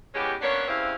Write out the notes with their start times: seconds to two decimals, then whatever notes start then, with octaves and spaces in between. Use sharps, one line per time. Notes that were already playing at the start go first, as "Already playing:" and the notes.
0.15 E3 G#3 B3 C#4 G4
0.42 A#3 B3 C#4 D4 C#5
0.68 G2 C#3 G3 C4 E4 F5